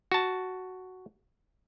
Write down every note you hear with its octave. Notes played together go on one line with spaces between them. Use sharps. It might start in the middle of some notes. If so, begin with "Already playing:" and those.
F#4 A5